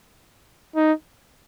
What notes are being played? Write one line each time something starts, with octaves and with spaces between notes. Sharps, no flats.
D#4